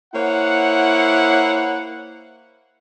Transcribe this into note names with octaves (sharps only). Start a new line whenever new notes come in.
A#3 E4 C5 C#5 F#5